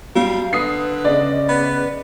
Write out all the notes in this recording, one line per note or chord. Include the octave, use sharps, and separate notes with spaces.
F#2 F#3 G3 F5
D3 B4 D#6 C7
C#3 D5 D#5
B3 B4